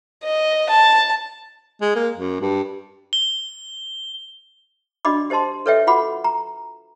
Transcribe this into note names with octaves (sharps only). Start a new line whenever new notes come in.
D#5
A5
G#3
A#3
F#2
G2
G7
D4 F#4 D5 D#5 B5 D6
G4 C5 D#5 A5 C6
A4 B4 C#5 D#5 E5 G5
F4 F#4 F#5 B5 D6
A#5